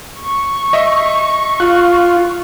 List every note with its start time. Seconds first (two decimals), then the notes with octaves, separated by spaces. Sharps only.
0.20 C#6
0.73 D#5 E5
1.60 F4 F#6